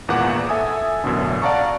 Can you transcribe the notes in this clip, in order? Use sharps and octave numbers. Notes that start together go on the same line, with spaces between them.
G#1 E2 A#2 B3 F#5 D6
A4 E5 G#5 D#6
A1 F#2 B2 D3
D5 F5 F#5 A5 A#5 C#6